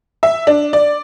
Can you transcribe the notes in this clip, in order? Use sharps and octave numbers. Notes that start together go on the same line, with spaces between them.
E5
D4
D5